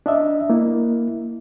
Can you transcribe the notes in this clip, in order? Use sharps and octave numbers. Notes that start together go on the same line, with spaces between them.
D4 D#5 E5
A#3 E4